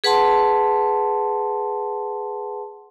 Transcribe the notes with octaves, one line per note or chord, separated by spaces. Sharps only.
G#4 B4 F#5 A5 C6